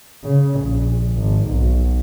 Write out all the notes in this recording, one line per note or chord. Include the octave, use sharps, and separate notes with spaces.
C#3
A#1
G#1
B1